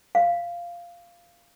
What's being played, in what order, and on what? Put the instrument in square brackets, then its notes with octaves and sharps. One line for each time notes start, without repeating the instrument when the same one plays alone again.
[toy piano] F5